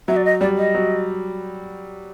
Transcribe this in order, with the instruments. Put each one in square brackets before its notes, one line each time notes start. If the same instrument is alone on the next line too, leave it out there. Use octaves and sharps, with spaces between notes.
[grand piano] F#3 [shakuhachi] E5
[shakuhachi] D5
D#5
[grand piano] G3 [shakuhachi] D5
[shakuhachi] D#5
[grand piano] F#3